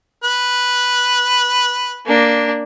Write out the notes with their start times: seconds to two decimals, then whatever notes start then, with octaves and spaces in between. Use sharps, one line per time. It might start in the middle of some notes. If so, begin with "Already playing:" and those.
0.24 B4
2.06 A#3 D4